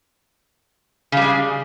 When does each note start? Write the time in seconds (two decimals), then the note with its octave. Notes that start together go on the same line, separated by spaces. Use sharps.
1.12 C#3
1.17 G3
1.22 G#3